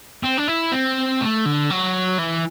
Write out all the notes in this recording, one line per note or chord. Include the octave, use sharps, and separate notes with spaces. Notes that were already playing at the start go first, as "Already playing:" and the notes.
C4
D4
E4
C4
A3
D3
F#3
E3